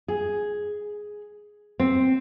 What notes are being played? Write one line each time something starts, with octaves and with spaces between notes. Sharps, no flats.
G#4
C4